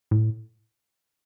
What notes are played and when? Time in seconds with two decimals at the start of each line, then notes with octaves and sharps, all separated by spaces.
0.11 A2